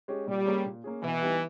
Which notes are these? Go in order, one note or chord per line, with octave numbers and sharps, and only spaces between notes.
G#3 C#4 G4
A#2 G3
A#3 C#4 G#4
A#2
A#3 C#4 G#4
B2 E3
G3 B3 D#4 G4